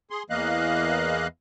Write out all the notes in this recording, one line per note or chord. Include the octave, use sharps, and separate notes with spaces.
G#4 C6
E2 E3 A#3 D#5 F5 F#6